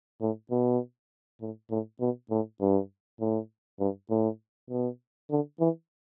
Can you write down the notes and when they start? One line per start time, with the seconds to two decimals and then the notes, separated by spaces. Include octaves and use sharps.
0.21 A2
0.51 B2
1.41 A2
1.70 A2
2.00 B2
2.31 A2
2.61 G2
3.20 A2
3.80 G2
4.10 A2
4.70 B2
5.30 D3
5.60 E3